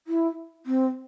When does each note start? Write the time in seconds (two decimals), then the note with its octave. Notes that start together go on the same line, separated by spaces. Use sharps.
0.07 E4
0.66 C4